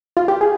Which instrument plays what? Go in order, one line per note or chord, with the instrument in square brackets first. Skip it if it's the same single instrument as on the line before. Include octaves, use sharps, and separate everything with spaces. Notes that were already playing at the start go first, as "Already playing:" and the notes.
[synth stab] F4
G4
G#4